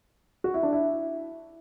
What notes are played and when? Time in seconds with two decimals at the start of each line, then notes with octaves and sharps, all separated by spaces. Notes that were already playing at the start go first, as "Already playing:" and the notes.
0.44 F#4
0.54 E4
0.63 D4
0.73 E4